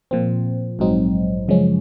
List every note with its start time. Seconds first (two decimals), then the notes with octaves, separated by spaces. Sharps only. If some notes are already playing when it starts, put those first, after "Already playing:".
0.11 A#2 F3 C4
0.79 A#1 G#2 F#3 C4 D#4
1.48 F#2 C#3 F3 G#3 C#4